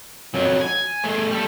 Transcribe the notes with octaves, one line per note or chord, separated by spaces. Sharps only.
F2 F#3
G#5
A3 G#4
G3 A4